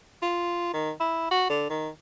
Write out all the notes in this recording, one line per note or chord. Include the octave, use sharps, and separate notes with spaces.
F4
D#3
E4
F#4
D3
D#3